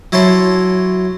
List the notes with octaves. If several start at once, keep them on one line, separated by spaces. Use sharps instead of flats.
F#3 E4 C#5 A5 C6